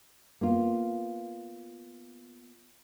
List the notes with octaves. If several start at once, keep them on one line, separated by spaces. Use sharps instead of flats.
A#3 B3 F4